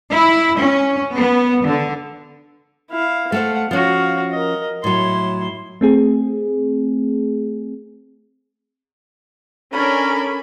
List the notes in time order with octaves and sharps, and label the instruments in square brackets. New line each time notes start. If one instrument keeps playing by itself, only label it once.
[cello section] E4
C#4
B3
D3
[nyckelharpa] E4 F5
[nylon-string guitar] A3 A4 C5 [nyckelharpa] F5 F#5
[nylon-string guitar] F3 C#4 [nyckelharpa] F#4 F5
[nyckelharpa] A#4 D#5
[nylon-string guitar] A2 F#3 [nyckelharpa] E4 C6
[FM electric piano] A3 C4 G#4
[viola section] C#4 [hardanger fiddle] D4 A#4 [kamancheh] A4 B5